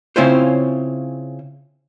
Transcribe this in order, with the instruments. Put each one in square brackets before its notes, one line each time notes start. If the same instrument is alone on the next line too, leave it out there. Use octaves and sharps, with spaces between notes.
[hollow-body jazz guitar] C#3 C4 C#4 E4 F4 C5